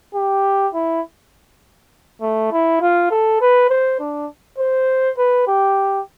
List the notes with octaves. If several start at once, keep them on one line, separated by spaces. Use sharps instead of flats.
G4
E4
A3
E4
F4
A4
B4
C5
D4
C5
B4
G4